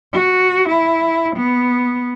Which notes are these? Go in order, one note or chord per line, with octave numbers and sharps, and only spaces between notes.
F#4
E4
B3